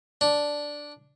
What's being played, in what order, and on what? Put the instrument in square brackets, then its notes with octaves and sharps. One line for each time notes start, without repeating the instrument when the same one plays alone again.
[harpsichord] D4